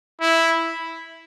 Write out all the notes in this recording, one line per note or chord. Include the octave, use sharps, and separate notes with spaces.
E4